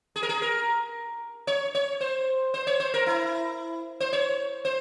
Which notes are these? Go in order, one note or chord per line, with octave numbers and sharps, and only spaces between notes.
G#4
A#4
G#4
A#4
C#5
C#5
C5
C5
C#5
C5
A#4
E4
C5
C#5
C5